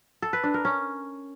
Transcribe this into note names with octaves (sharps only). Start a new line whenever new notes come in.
A4
B4
D4
A#4
C#4